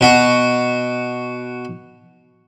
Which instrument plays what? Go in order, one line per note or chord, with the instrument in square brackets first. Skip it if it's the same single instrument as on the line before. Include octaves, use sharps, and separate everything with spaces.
[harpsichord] B2 F#4